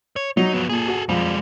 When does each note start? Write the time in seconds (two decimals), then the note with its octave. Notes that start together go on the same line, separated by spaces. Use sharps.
0.16 C#5
0.37 F#3 D#4
0.53 F3 B3
0.69 A#2 G#4 A4
0.88 F#4
1.09 F2 G3 G#3